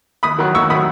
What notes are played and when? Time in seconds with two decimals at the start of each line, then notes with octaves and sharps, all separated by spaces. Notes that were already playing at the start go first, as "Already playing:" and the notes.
0.23 D#2 B5 D#6
0.38 D#3 F#3
0.55 D#2 C#6 E6
0.70 D#3 F#3 B5 D#6